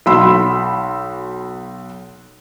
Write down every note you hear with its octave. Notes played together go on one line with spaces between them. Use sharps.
B1 F#4 B5 C6 E6